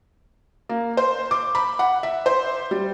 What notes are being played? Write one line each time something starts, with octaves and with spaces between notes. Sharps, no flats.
A#3
C5
D6
B5
F#5
E5
C5
G3